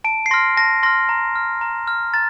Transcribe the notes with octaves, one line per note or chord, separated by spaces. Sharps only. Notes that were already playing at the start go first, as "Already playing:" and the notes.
A5 D7
C7
C6 F6 A#6
A5 A#6
C6 F6 A#6
A#5
F6
A#5
F6
A#5 A6